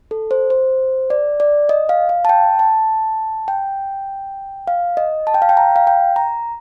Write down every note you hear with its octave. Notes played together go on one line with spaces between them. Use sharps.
A4
C5
C5
D5
D5
D#5
F5
F5
A5
G5
A5
G5
F5
D#5
A5
G5
F5
G5
A#5
F5
G5
A#5